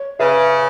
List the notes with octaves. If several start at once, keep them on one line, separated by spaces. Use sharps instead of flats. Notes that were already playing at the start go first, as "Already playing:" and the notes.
Already playing: C#5
C#3 B4 E5